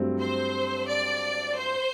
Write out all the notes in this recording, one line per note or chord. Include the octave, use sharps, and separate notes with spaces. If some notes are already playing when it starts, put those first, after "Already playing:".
Already playing: G2 F#3 A3 C4
C5
D5
C5